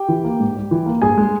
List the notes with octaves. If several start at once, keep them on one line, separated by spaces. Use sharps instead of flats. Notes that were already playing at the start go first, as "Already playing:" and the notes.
Already playing: G4 G5
E3
A#3
G#2
G3
E3
A#3
G2 G#4 G#5
G#3